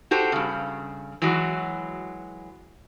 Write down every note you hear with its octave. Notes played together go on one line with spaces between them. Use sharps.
F#4 G4 A4 C5
G2 C#3
E3 F#3 G#3 F#4